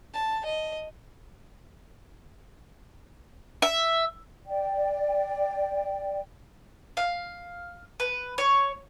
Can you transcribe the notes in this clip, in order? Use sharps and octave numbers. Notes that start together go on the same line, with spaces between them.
A5
D#5
E5
D5 G5
F5
B4
C#5